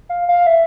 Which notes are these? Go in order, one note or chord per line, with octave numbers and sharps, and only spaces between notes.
F5
F5
E5